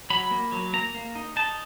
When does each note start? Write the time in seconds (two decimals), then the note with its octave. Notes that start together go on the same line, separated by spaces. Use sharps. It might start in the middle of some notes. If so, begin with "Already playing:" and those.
0.10 F#3 B5
0.31 A#3
0.52 F#3
0.73 A#3 A#5
0.94 A#3
1.15 D#4
1.36 D#4 A5